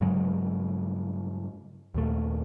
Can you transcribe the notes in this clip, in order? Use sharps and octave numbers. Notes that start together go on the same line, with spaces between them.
G2 C#3 F#3 G#3
D#2 A#2 A3